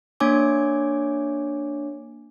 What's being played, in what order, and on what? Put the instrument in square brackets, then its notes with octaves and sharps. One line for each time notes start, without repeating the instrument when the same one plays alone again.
[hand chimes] A#3 D4 C#5 G#5 D6